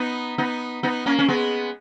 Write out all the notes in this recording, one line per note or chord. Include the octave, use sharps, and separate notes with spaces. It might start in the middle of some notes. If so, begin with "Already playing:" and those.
Already playing: B3 D#4
B3 D#4
B3 D#4
A#3 C#4
C#4
G#3 B3